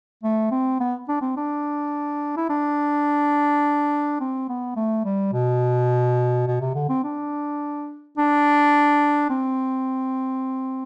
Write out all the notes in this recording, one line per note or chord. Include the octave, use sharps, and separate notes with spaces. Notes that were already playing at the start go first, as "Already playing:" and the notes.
A3
C4
B3
D4
C4
D4
E4
D4
C4
B3
A3
G3
B2
B2
C3
D3
C4
D4
D4
C4